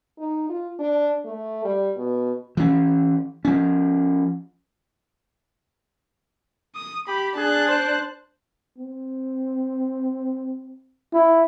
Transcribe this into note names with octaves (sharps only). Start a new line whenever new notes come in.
D#4
F4
D4
A3
G3
B2
E3 C#4
F3 C#4
D#6
G4 B5
D4 G#4 A5 F#6
C5
C4
E4